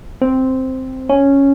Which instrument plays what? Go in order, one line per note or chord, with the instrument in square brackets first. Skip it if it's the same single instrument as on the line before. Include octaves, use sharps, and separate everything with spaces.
[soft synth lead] C4
C#4